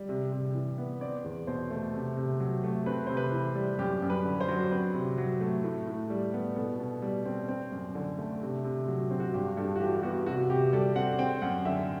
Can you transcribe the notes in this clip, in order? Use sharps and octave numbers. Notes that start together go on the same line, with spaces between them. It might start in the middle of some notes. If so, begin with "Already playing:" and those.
Already playing: G3
C3
C3
E3
B3
C4 D5
E2
B2 C5
A3
C3
C3
F#3
A3
C4 B4
C3 C5
B4
E3
G3
F#2 G4
F#2
B4
D3
C5
F#3
C4 B4
C3
F#3
A3
A2
A2
G3
B3
B2 A4
B2
G3
C4
C4
F#2
D3
A3
C3
C3
F#3
C4
F#4
G2 G4
G2 A4
F#4
E3 G4
B3 F#4
C3 F#4
C3 G4
G3 A4
C4 F#5
C4 G5
F#2 F#5
D3 E5